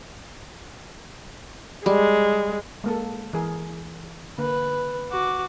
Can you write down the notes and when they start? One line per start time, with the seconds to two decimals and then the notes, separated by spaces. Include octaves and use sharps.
1.86 G3 G#3
2.84 G#3 A#3 A4
3.33 E3 G#4 A#4
4.38 D3 A#3 B4
5.11 F#4 D6